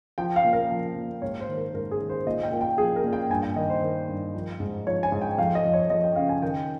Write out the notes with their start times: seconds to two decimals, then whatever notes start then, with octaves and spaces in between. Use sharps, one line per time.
0.18 F3 G5
0.36 F5
0.44 A#2
0.53 A#4
0.71 F3
0.96 A#2
1.22 G#2 C#5
1.40 C5
1.48 D#3
1.57 A#4
1.74 G#2 A#4
1.91 G#4
2.00 D#3
2.10 C5
2.26 A#2 D#5
2.43 G5
2.52 A#2
2.61 G5
2.78 F3 G#4
2.96 A#4
3.04 A#2
3.13 G5
3.30 G2 G#5
3.43 G5
3.56 D#3 D#5
3.70 C5
3.82 D#3
4.08 G2
4.34 F3
4.60 G#2
4.86 F3 C#5
5.03 G#5
5.12 G#2
5.21 G5
5.38 F2 F5
5.55 D#5
5.65 F2
5.74 C#5
5.90 F2 D#5
6.04 G5
6.16 C#3 F5
6.29 G#5
6.42 D#3 G5